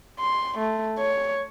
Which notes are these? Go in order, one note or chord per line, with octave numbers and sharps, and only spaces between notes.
C6
A3
C#5